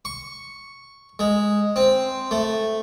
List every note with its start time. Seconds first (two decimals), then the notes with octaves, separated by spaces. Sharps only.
0.05 C#6
1.19 G#3
1.76 C4
2.31 A3